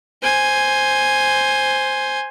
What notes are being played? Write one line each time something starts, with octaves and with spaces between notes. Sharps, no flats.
C5 G#5